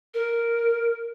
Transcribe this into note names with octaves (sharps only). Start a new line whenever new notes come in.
A#4